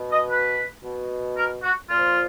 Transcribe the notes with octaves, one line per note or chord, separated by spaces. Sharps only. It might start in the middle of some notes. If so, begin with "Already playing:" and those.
Already playing: B2
D#5
B4
B2
A#4
F#4
A#2 F3 F4